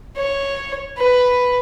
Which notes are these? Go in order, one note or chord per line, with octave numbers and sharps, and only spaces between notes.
C#5
B4